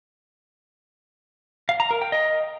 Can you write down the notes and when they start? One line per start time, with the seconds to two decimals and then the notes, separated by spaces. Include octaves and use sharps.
1.69 F5
1.80 A#5
1.91 A#4
2.01 G5
2.12 D#5